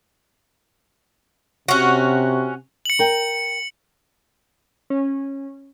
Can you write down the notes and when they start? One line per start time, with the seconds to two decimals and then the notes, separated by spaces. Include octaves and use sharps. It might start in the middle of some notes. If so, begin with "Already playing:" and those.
1.68 C3 C#4 F#4
2.85 C#7 F#7
2.99 A#4 G5
4.90 C#4